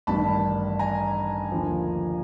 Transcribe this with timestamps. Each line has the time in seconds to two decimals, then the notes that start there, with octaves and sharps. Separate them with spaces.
0.07 A1 G2 D#3 A5 B5
0.79 G#5 A#5
1.52 D#2 D3 F3